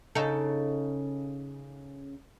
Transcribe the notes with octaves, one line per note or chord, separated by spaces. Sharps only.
C#3 D#4 A4